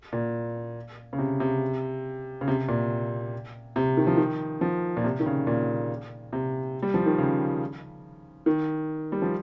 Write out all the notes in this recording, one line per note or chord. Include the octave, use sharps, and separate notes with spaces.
A#2
C#3
C3
C3
C#3
C3
A#2
C3
D#3
F3
D#3
F3
A#2
C3
D#3
C#3
A#2
C3
G3
F3
D#3
C#3
D#3
G3
F3